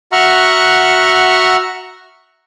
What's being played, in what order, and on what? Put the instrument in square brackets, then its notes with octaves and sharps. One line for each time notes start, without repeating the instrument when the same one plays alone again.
[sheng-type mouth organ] F#4 E5 F#5 A#5 C#6 F6